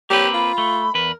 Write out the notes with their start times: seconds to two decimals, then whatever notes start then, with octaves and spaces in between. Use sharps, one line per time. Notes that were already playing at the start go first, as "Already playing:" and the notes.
0.10 A#3 C4 G4 B4 C#5
0.34 F4 B5
0.58 A3
0.95 E2 A#4 B4